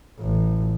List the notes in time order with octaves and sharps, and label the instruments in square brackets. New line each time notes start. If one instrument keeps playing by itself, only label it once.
[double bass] A1